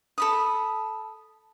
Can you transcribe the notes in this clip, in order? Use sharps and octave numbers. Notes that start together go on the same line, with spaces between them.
A4 B5 D#6